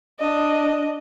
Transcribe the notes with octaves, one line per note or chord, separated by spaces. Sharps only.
D4 D#5